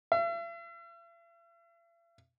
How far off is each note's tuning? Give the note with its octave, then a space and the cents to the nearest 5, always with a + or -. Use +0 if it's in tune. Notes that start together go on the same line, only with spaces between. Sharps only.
E5 +45